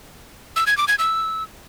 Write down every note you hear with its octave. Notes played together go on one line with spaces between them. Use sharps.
E6
G#6
D6
G#6
E6